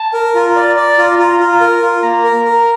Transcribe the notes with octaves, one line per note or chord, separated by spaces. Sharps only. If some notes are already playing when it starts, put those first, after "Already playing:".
Already playing: A5
A#4
F4 A#5
D5
D5
F4
F4
F4
A#4
F4
A#3 A#5
A#4
A#4